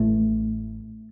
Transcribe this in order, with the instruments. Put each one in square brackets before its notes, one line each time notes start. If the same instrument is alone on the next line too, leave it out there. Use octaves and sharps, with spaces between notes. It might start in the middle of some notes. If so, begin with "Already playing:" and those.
Already playing: [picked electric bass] A1 A2 A3